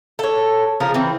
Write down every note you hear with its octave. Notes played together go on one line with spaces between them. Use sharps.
A4 C#5
C#3 F3 A#4
E3 C4